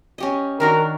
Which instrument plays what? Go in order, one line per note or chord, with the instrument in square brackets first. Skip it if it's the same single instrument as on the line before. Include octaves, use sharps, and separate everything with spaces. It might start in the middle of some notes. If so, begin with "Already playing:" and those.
[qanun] C#4 G4 D#5
[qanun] D#3 D4 F#4 [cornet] A#4